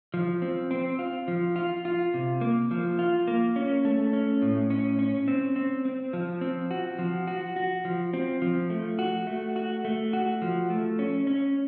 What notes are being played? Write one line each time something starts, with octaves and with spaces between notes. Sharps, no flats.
F3
C4
C4
F4
F3
F4
F4
C3
A#3
F3
F4
A#3
C#4
A3
C#4
A2
C#4
C#4
C4
C4
C4
F3
C4
F#4
F3
F#4
F#4
F3
C4
F3
A3
F#4
A3
F#4
A3
F#4
F3
A3
C#4
C#4